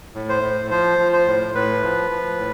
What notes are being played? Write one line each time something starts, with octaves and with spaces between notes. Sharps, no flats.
A2
C5
A2
F3 C5
F3
C5
A2
A2 B4
F3
F3
A2